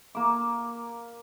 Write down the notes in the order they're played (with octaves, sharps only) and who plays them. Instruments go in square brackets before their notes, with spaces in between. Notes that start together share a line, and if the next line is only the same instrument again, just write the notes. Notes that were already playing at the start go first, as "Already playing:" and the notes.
[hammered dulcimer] A#3 D6